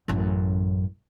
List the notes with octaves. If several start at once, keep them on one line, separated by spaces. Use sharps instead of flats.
A1 F#2